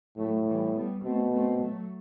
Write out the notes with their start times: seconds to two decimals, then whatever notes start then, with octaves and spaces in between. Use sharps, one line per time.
0.18 A2 F#3 A3
0.47 E3 G3
0.75 G3 B3
1.03 B2 A3 C4
1.33 A3 C4
1.61 F#3 A3